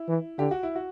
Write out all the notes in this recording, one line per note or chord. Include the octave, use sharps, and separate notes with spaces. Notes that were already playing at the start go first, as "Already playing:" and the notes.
Already playing: E4
E3
D3 G4
F#4
E4
F#4